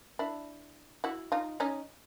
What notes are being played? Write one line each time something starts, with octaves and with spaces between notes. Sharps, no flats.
D4 E4
E4 F#4
D#4 F4
C#4 D#4